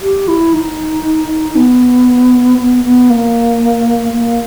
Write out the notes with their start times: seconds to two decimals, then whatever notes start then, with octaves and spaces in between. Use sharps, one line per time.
0.02 G4
0.28 E4
0.54 D#4
1.56 B3
2.59 B3
2.84 B3
3.10 A#3
4.13 A#3